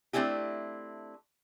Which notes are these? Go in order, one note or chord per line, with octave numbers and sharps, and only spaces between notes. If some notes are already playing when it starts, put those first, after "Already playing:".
A3 C4 D4 E4 G4